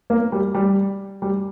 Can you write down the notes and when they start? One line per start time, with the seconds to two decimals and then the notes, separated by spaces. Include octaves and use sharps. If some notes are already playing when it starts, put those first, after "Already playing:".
0.10 A#3
0.32 G3
0.55 G3
1.22 G3